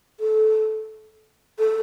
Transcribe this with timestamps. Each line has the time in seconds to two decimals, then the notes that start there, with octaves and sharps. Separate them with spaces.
0.20 A4
1.59 A4